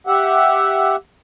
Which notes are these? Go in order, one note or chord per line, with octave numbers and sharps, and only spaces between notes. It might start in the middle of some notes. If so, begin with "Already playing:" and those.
G4 E5 F#5